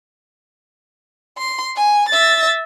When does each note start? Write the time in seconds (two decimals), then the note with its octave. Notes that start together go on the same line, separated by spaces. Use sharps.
1.38 C6
1.76 G#5
2.09 E5 A6